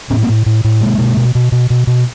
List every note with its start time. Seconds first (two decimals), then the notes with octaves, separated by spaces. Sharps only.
0.10 A2 B3 C#4
0.22 A#3 C4
0.28 A2
0.46 A2
0.64 A2
0.81 B2 G#3 A#3
0.99 B2
1.17 B2
1.35 B2
1.52 B2
1.70 B2
1.87 B2